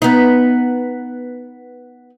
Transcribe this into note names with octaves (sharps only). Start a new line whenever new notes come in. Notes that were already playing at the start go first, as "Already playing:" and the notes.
B3 D#4